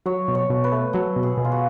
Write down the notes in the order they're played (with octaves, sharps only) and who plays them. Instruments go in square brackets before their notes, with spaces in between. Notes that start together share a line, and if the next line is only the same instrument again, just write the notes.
[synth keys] F#3 [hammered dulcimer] C#5
[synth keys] B2
[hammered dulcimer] C#5
[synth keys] B2
[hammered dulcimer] B4
[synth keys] A3
[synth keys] F#3 [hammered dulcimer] A4
[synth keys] B2
[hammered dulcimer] G#4
[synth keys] B2
[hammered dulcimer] F4
F#4